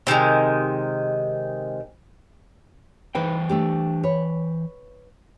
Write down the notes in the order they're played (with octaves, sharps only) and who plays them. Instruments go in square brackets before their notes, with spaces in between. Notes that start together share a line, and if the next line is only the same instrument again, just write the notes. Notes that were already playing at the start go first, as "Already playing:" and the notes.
[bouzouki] C3 D#3 G3 G#3
[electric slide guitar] E3 C5 G5 [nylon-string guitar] D#4 B4 E5
[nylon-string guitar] A3 D4 G4
B4 C#5